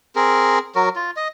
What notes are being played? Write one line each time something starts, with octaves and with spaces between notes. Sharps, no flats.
C4 G#4 A#4
F#3 F#4 A#4
F4
D#5